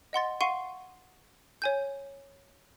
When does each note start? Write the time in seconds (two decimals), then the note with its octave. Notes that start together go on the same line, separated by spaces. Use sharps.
0.13 D#5 F#5 C6 A6
0.41 F5 F#5 C6 C#6 C7 D#7
1.62 C#5 G#5 G6